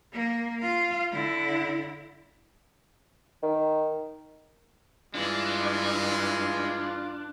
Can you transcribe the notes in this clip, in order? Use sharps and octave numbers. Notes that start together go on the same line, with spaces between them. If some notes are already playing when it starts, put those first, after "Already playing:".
A#3
F4 F5
D3 E4
D#3
G2 E3 G#3 D4 F4